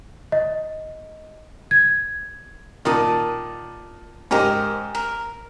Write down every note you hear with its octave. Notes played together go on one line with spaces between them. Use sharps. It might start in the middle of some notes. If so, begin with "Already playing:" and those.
D#5
G#6
A#2 D#3 D5 A5 D#6
G#2 G4 G#4 A#4 C5 D#5
A#4